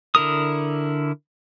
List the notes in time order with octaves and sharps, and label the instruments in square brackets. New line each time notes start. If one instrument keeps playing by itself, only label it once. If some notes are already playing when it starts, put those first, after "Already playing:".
[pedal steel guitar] D3 E4 A#4 D#6